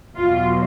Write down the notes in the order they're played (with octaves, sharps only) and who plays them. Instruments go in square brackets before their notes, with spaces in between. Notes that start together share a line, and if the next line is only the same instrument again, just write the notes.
[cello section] E2 B2 F#3 F4